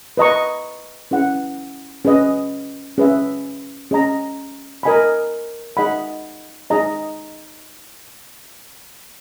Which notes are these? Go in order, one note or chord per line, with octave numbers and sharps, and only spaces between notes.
B4 D#5 A#5 C#6
C#4 E4 G#4 B4 F#5
C#4 G#4 B4 D#5
C#4 G#4 B4 E5
C#4 G#4 D#5 A#5
A#4 D#5 G#5 B5
D#4 G#4 D#5 F#5 B5
D#4 G#4 D#5 A#5